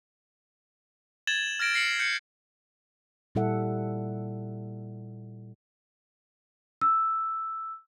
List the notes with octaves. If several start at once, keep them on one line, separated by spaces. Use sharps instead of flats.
G#6 A6 E7 F#7 G7
F6 G#6 A#6 D7 E7
A6 A#6 C7 C#7 F#7
G6 C#7
A#2 G3 E4 A4 E5 F#5
E6